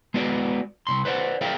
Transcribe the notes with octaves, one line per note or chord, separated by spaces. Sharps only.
G#3 B3 F#4 D5
C2 G#2 C6
B4 C5 D5 F#5
G#4 A#4 D5 E5 F5 G5